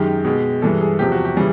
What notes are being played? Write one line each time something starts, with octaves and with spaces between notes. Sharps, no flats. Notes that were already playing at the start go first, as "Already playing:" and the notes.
Already playing: F#2 D#3 G#3 G4
B2 G#3
G2 E3 G#3 A4
G#4
E2 C3 F3 G4
F#4
G4
C#3 E3 G3 G#4